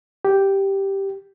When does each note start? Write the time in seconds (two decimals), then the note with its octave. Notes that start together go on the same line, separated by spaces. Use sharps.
0.25 G4